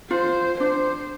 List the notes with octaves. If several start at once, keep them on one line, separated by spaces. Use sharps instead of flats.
F4 C5
D4 C5